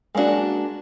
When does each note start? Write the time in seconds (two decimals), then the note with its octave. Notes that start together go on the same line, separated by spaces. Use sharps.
0.15 G#3 A#3 B3 D4 F#4